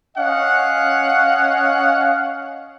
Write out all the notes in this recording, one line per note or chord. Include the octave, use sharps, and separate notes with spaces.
C#4 D#5 F5 F#5